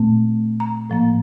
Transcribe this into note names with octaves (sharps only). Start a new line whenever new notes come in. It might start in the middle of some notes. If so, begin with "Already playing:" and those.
Already playing: A#2 A3 C4
A#5
A2 F3 A#3